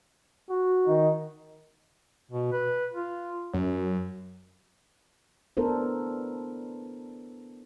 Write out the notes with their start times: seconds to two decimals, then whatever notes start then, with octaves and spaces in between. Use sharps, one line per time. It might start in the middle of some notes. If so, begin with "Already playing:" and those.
0.50 F#4
0.87 D#3 D#4
2.31 B2
2.52 B4
2.93 F4
3.54 F#2
5.57 B3 D4 E4 A4 A#4 C5